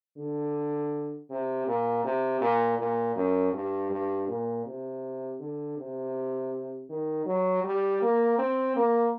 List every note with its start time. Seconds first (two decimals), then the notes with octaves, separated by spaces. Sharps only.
0.18 D3
1.30 C3
1.67 A#2
2.04 C3
2.41 A#2
2.79 A#2
3.16 F#2
3.53 G2
3.90 G2
4.28 A#2
4.66 C3
5.40 D3
5.78 C3
6.90 D#3
7.26 F#3
7.64 G3
8.02 A#3
8.38 C4
8.76 A#3